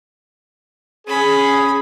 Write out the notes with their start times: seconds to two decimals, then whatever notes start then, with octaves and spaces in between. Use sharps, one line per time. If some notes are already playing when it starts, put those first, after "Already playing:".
1.07 C#4 G#4 B5